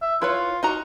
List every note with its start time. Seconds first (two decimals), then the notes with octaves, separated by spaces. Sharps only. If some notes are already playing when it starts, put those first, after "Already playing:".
0.02 E5
0.22 E4 F4 B4 C#5
0.63 D#4 F#4 A#5